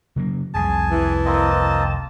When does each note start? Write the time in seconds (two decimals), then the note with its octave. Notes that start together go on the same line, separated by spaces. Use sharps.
0.16 C#3 F#3 A#3
0.54 F1 C2 G#4 G#5 A5
0.91 E3
1.25 A#3 C4 D#5